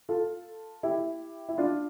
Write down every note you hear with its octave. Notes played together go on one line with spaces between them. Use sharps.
F4 A4
E4 G4
E4
D4 F4